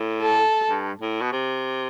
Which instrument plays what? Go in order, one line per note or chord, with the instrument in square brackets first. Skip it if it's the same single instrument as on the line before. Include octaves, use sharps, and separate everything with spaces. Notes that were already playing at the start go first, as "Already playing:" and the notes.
Already playing: [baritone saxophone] A2
[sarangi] A4
[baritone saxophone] G2
A2
B2
C3